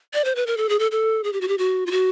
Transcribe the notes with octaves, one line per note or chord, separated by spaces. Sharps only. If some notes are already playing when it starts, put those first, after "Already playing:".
D5
C5
B4
A#4
A4
G#4
A4
A4
G#4
G4
F#4
G4
F#4
F4
F#4